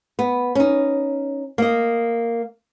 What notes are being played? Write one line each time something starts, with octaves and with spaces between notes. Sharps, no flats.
B3
C#4 D#4
A#3 D#5